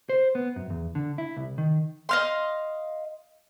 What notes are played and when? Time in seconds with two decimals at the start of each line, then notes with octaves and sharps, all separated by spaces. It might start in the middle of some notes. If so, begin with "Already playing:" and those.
0.09 C5
0.35 B3
0.56 F#2
0.70 E2
0.95 D3
1.18 E4
1.36 C2
1.58 D#3
2.09 D#5 F5 C6